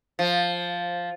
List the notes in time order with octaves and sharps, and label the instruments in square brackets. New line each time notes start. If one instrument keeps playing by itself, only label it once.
[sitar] F3